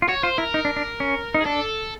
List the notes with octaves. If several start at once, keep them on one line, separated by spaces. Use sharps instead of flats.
F4
F#4 C#5
F4 C5
E4 A#4
D#4
D4
D4
C#4
D#4
G#4
D4 A4